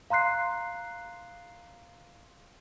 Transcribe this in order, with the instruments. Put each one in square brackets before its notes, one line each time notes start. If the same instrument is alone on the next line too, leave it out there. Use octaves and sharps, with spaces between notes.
[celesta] F5 A#5 C6 F#6 C7